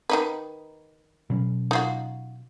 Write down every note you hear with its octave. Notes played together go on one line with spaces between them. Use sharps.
D#3 D#4 B4
B2 F#3 C#4
D#4 F4 F#4